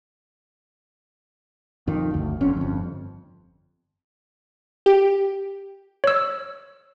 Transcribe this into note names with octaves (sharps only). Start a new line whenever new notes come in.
F2 D#3
G1 D2
F#1 F2 D3 C#4
G1 F2
G4
C#5 E6